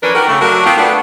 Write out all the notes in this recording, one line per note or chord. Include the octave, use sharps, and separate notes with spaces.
E3 F3 C#4 D4 A#4 B4
D#4 F#4 G4 A#4
C#3 A3
F#3 A3 D4 F#4 A#4
B3 C4 F4
A3 B3 D4